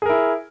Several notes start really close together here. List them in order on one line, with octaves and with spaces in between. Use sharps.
G#4 A#4 E4